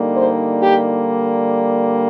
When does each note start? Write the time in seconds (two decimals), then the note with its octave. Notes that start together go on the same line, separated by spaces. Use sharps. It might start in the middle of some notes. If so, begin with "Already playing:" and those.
Already playing: D3 G3 A#3 D#4
0.16 C5
0.62 G4